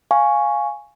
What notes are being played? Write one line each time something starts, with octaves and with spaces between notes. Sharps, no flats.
F5 G#5 C#6